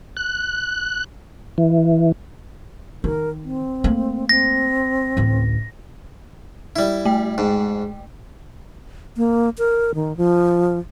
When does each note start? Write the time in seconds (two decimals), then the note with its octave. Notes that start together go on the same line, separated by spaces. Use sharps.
0.17 F#6
1.58 E3
3.04 D#3 A#4
3.44 C4
3.84 A3 A#3
4.29 C4 A#6
5.17 A1 D2
6.76 G3 E4
7.05 A3 G5
7.38 G#2
9.17 A#3
9.58 A#4
9.95 D#3
10.17 F3